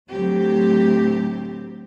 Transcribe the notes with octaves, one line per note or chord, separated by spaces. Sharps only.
D2 A2 F#3 A3 C4 G4